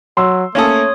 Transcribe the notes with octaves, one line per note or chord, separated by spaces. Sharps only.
F#3 C6 E6
A3 A#3 C#4 A4 C#5 D#6